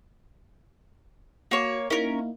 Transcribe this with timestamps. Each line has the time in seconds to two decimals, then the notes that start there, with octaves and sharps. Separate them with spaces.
1.51 A#3 F#4 C#5
1.90 A#3 C#4 D#4 E4 A#4